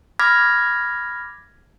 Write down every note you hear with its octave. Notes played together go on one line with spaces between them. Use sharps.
B5 D6 F6 G#6 A#6 B6